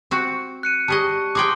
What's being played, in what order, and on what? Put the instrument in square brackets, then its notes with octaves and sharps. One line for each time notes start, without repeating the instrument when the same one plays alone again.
[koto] C4 F#4
[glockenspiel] F#6 C#7 D#7
[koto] G3 G#4 D#5 [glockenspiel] A5 C#6
[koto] D#4 G#4 G5 [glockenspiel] C6 D6